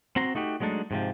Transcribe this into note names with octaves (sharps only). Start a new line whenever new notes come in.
C4 F#4 A#5 C6
A3 D#4 F#4 G4
F#3 G#3 A3 D4 D#4
G#2 C3 F3